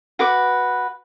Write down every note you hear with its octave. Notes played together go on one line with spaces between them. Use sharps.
F#4 B4 D6